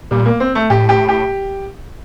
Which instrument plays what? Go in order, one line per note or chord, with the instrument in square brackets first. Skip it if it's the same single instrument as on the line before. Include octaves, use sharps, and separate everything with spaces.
[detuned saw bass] A#2 [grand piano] G3
[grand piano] A#3
C4
A3
[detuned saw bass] A2 [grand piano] G4
[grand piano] G4
G4